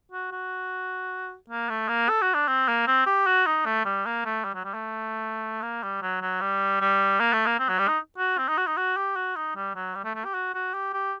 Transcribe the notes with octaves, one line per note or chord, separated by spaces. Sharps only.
F#4
F#4
A#3
A3
A#3
A4
F#4
D4
C4
A#3
C4
G4
F#4
D#4
A3
G3
A#3
A3
G3
F#3
G3
A3
A#3
G3
F#3
F#3
G3
G3
A#3
A3
A#3
C4
F#3
G3
D#4
F#4
C4
D#4
F#4
D#4
F#4
G4
F#4
D#4
G3
F#3
G3
A3
A3
G4
F#4
F#4
G4
G4